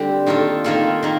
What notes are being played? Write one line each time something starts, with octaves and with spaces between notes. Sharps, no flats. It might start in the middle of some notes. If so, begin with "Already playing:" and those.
Already playing: D3 G3 C4 G4
D#3 A#3 F4 A4
D#3 A#3 F4 A4
D#3 A#3